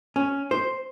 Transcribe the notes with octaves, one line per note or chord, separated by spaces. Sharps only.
C#4
C5